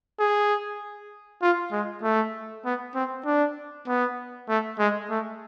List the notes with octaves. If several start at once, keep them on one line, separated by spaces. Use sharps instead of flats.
G#4
F4
G#3
A3
B3
C4
D4
B3
A3
G#3
A3